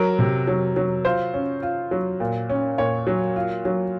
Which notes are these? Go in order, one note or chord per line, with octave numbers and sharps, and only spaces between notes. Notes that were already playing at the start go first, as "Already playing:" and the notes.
Already playing: F#3 A#4
C3
F#3
F#3
F4 C5
C#4
F4
F#3
A#2
C#4
A#2 C#5
F#3
F4
F#3